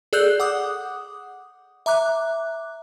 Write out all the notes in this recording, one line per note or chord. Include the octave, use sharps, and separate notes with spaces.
G#4 A4 D5 E6 F#6 G6
F#5 D6 D#6
E5 A#5 D6 F#6